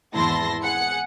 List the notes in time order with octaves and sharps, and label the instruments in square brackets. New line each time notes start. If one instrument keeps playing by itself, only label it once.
[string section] G#1 E2 E4 A5 C6 A#6
G#4 F#5 C#7